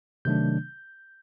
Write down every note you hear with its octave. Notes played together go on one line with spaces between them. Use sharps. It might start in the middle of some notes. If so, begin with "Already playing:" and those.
C3 D#3 F#3 A3 D4 G6